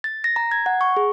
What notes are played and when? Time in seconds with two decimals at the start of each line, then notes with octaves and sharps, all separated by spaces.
0.04 A6
0.24 A#6
0.36 A#5
0.51 G#6
0.66 F#5
0.81 C#6
0.97 G#4